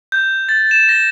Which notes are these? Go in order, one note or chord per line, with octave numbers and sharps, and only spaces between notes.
G6
A6
E7
A#6